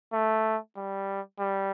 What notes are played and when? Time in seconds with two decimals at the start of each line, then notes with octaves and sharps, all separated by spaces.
0.13 A3
0.77 G3
1.39 G3